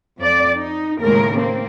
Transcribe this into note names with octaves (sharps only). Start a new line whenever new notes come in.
F2 D5
D#4
D#2 A2 C#3 G#3 A#4
A#3 C4